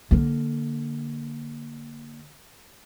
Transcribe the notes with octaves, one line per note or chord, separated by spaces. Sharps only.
D3 A#3